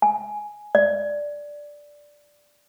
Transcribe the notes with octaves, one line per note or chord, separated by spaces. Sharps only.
G#5
D5